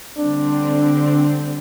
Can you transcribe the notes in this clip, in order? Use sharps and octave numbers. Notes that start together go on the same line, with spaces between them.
D3 G3 C4 D4